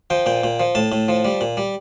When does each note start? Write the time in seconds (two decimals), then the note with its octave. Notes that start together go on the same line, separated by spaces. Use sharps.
0.10 F3 G5
0.26 A#2 G5
0.43 A#2
0.60 F3
0.75 A2 A5
0.92 A2
1.08 F3
1.25 G3
1.41 A#2
1.57 G3